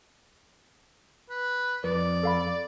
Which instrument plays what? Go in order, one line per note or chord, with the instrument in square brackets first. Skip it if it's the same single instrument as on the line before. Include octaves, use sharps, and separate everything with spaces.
[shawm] B4
[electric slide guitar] F2 [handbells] B4 [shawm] D5
[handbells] A4 F5 B5